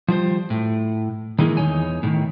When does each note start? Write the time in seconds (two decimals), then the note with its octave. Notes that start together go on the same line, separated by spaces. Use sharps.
0.08 F3 G3 C5
0.50 A2
1.39 D#3 E3 G#3 A#3
1.57 E2 D#3 D#4 C#5 G#5
2.03 A2 C3 D#3